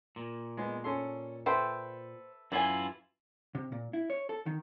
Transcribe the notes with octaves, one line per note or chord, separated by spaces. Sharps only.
A#2
G#3 B3
C#4 A4 C6
A4 B4 C5 E5 G5
F#2 E3 E4 F4 G#5
C3
A#2
E4
C#5
A4
D#3